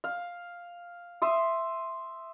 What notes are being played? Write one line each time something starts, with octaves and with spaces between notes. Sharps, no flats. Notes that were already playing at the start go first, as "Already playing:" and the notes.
F5
E5 C6 D#6